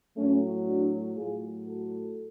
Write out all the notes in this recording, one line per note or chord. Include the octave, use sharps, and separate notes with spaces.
A2 F#3 A3 C#4
D4 F#4
A2 F#3 F4 G#4
F#4 A4